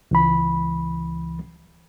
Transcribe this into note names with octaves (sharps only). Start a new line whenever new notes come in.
C#2 E3 B5